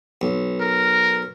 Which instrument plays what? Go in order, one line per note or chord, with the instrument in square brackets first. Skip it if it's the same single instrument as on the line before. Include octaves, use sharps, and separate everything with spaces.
[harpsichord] B1
[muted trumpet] A#4